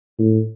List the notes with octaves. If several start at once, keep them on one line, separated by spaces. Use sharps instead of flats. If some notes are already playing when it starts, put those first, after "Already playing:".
A2